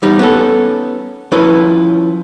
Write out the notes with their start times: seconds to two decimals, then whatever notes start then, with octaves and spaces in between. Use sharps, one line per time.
0.02 E2 G3 D#4
0.19 B3 C#4 A4
1.32 F3 C#4 E4 B4 D#5